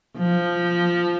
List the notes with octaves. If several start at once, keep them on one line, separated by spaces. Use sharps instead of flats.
F3